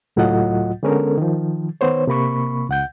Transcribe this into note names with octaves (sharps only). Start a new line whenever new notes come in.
C#2 A2 F#3 F4 D#5 F#5
D3 G#3 B3 C#4 A4 A#4
D#3 F3
D#3 B3 C5 C#5
C3 A#3 B5 C#6
C#2 F#5 G6